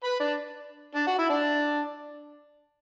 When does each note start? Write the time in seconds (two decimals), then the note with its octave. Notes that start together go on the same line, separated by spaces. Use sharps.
0.04 B4 B5
0.20 D4 D5
0.95 D4 D5
1.07 F#4 F#5
1.18 E4 E5
1.30 D4 D5